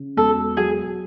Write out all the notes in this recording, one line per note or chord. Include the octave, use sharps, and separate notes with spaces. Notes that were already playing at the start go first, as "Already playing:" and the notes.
Already playing: C#3
E1 A4
F#3 G#4